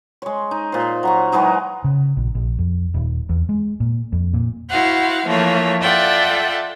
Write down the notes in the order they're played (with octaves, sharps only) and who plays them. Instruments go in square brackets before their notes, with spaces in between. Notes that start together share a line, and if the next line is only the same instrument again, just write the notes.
[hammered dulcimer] G#3 C#5
D#4
A#2 C5
F#3 A#5 C#6
E3 F#3 G#3 D#4
[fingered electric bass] C#3
A#1
A#1
F2
D#1
E2
G#3
A#2
F2
A#2
[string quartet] E4 F#4 C5 F5 F#5
E3 F3 A3 A#3 C#5
F4 A4 D5 E5 F#5 G5